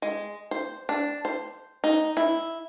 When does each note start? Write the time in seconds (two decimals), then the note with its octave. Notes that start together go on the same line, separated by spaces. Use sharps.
0.02 G#3
0.51 C5
0.89 D4
1.25 C5
1.84 D#4
2.17 E4